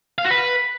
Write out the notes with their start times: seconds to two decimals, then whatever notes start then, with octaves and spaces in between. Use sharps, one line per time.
0.18 F5
0.25 F#4
0.31 B4